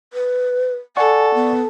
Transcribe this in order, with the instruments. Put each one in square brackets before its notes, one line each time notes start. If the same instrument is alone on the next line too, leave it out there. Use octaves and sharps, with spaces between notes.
[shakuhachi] B4
[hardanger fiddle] A4 [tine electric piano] D5 F#5 C#6 [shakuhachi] G#5
[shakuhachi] B3